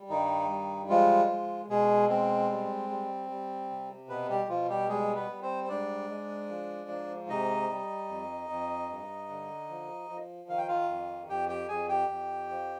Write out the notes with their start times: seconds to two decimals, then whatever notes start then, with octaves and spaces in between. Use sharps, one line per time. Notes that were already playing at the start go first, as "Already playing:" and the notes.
Already playing: G3
0.09 G2 D#3 D#4
0.49 G3
0.89 F3 G#3 F4
1.29 G#3
1.69 B2 G#3 G#4
2.09 G#3 C4
2.49 G3
2.89 G3
3.29 G3
3.70 C3
4.09 B2 B3 B4
4.29 G3 G4
4.49 B2 F3 F4
4.69 G3 G4
4.89 G3 G#3 G#4
5.16 B3 B4
5.30 G3
5.42 C4 C5
5.64 C5
5.69 G#2 D4 D5
6.10 G#3
6.49 F3
6.89 G#2
7.29 C3 D#4 D#5
7.70 G3
8.09 F2
8.49 F2
8.89 G2
9.29 D3
9.69 F3
10.10 F3
10.49 D#3 F5
10.58 G5
10.68 F4 F5
10.89 F2
11.29 F2 G4 G5
11.49 G4 G5
11.68 F2 G#4 G#5
11.89 G4 G5
12.08 F2
12.49 F3